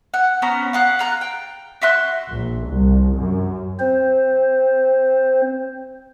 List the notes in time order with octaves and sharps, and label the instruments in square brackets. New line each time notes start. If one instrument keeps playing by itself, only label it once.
[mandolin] F#5
B3 C#4 C5 A#5
F5 F#5 F#6
F4 A#5 F#6
G5
F#4 E5 C6 F#6
[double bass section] A#1
C2
F#2
[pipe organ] C4 C5